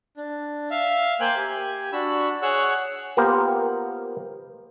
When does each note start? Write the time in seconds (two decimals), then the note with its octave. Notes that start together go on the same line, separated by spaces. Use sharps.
0.17 D4
0.71 E5 F5
1.20 A#3 C5 G5 G#5 F#6
1.37 G4 G#5
1.93 D4 F#4 B5 E6
2.42 G#4 C#5 F#5 E6
3.17 A#3 B3 F4 G4 A#4 C5